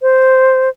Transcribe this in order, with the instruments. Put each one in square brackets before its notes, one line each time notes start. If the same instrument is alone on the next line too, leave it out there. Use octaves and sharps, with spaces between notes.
[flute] C5